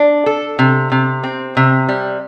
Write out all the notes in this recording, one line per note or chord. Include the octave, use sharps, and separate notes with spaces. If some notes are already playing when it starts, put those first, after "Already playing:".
Already playing: D4
A4
C3
C3
C4
C3
G3